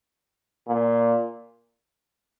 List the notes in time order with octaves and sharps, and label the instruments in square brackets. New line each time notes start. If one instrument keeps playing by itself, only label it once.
[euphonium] A#2